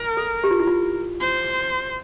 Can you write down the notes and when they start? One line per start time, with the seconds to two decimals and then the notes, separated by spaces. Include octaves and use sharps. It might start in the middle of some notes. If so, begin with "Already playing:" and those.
Already playing: A#4
0.17 A4
0.44 G4
0.51 F4
0.60 E4
0.67 F4
1.20 C5